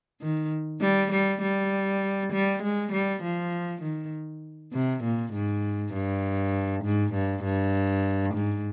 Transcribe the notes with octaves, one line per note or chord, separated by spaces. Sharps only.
D#3
G3
G3
G3
G3
G#3
G3
F3
D#3
C3
A#2
G#2
G2
G#2
G2
G2
G#2